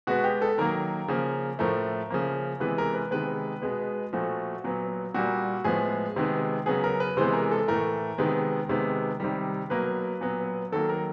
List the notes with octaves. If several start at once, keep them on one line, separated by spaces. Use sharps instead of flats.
B2 G#3 B3 F#4
G4
A4
D#3 F#3 A#3 A#4
C#3 F3 A#3
A2 F3 A3 A#4
C#3 F3 A#3
C3 E3 G#3 B3 B4
A#4
B4
C3 D#3 G#3 B3 B4
B2 G#3 B3
A#2 F3 A3 F#4
A#2 F#3 B3
A#2 G3 A#3 F#4
A2 F3 G#3 B3 G#4
C3 D#3 G#3 B3
C#3 F#3 B3 G#4
A#4
B4
C3 E3 G#3 B3 C5
A#4
A4
A2 E3 A3 A#4
C3 D#3 G#3 B3
C3 D#3 G#3 B3
C3 D#3 G3
B2 F#3 A#3 B4
A#2 F#3 B3
D#3 F#3 A#3 A4
A#4